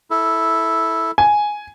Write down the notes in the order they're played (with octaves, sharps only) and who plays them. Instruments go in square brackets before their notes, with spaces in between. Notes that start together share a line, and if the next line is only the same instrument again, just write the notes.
[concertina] E4 A4
[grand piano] G#5